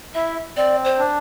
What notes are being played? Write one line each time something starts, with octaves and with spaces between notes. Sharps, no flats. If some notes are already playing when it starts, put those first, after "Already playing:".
E4 E5
C4 D5
C5
D4